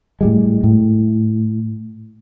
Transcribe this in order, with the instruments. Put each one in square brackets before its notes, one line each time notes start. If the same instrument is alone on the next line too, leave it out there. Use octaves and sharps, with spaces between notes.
[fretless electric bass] A2 G3 G#3
A2